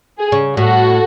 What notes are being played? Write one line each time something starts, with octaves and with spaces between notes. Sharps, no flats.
G#4
C#3
A2 F#4 A4